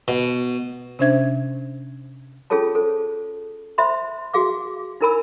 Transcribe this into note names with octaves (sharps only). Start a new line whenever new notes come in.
B2
C3 C#4 D4 C5 E5 G#6
C#4 F4 G#4 A4 C#5 A5
A4 C5
C5 E5 B5 C6
F#4 G#4 F5 D6
D#4 E4 A#4 G#5 B5 E6